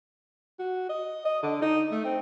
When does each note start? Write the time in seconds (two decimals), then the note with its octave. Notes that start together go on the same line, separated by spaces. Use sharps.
0.59 F#4
0.89 D#5
1.25 D#5
1.43 D3
1.62 D#4
1.91 A3
2.05 C4